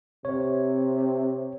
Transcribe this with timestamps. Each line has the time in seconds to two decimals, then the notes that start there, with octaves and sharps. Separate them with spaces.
0.25 C3 C#5